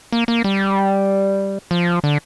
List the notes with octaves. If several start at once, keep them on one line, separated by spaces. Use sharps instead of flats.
A#3
A#3
G3
F3
D3